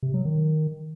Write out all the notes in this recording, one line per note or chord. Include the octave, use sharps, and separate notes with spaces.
C3
F#3
D#3